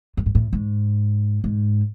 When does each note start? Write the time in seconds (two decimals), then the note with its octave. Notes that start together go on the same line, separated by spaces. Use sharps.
0.17 G2
0.26 G#2
0.35 A2
0.53 G#2
1.44 G#2